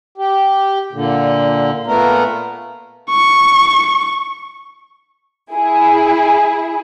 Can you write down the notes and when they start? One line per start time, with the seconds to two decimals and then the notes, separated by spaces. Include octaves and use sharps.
0.18 G4
0.92 A#2 D3
1.87 A#2 A3 B3 A#4
3.10 C#6
5.53 E4 G#4